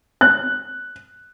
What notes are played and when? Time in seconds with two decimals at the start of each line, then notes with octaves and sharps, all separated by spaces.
0.21 F#6